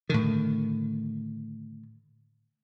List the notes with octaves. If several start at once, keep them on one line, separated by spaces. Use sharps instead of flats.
A2 D3 D#3